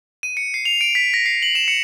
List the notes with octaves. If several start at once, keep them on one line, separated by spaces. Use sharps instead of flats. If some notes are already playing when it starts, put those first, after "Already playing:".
D#7
C#7
C7
F7
D7
B6
A#6
C7
F#7
E7
C#7